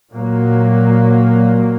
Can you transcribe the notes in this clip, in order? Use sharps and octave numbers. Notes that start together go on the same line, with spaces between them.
A#2 F#3 A#3